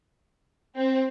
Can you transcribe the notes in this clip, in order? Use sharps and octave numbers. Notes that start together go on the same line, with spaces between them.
C4